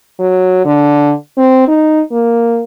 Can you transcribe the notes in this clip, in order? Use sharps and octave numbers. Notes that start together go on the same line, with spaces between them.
F#3
D3
C4
D#4
A#3